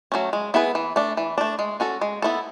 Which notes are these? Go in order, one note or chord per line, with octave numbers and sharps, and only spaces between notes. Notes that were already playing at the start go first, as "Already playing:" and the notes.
F#3 A3 C#4
G#3
B3 E4 G#4 B4
E3
A3 D4
E3
A3 D4
G#3
C#4 F#4 A4
G#3
B3 E4 A4